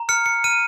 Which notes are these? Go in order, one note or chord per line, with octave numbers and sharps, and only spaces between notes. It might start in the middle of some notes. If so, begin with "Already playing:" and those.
Already playing: A#5
F6 C#7
C#7
F6 D#7